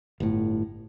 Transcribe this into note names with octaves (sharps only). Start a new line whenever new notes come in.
G1 A2